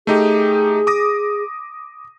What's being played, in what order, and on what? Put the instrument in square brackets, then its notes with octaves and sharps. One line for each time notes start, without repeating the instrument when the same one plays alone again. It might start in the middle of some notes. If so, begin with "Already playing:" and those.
[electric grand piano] A3 D#4 G4 [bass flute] G#4
[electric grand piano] D6 D#6 A#6